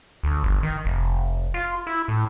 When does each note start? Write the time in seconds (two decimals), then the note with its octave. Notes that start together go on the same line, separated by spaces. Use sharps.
0.24 D2
0.43 G1
0.63 D#3
0.85 F1
1.54 F4
1.87 E4
2.08 A2